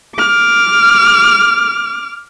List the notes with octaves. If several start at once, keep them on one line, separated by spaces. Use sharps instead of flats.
D6 F6